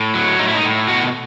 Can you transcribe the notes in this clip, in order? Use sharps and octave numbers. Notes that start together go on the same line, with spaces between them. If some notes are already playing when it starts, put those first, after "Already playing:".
Already playing: A2
F#3
A2 D#4
E4
D#4
A2
B2 F#4